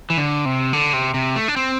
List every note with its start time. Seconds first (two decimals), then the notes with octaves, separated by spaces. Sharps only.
0.10 E3
0.17 D3
0.45 C3
0.73 D3
0.93 C3
1.14 C3
1.36 A3
1.48 D4
1.56 C4